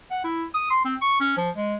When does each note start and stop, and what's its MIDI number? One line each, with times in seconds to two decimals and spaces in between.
0.11 0.24 78
0.24 0.45 64
0.55 0.67 87
0.70 0.80 84
0.84 0.95 60
1.01 1.16 85
1.20 1.33 61
1.37 1.50 53
1.56 1.76 56